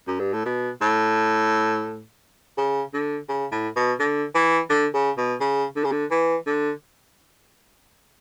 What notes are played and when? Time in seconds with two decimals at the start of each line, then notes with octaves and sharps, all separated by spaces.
0.08 F#2
0.20 G2
0.33 A2
0.46 B2
0.81 A2
2.58 C#3
2.94 D3
3.29 C#3
3.52 A2
3.76 B2
4.00 D3
4.35 E3
4.70 D3
4.94 C#3
5.18 B2
5.41 C#3
5.76 D3
5.84 C#3
5.92 D3
6.11 E3
6.47 D3